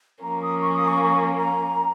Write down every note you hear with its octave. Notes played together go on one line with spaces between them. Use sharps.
F3 A#3 C#4 A#5
D#6
C#6
D#6
C#6
A#5